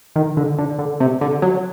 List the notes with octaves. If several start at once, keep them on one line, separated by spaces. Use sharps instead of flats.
D#3
D3
D3
D3
C3
D3
F#3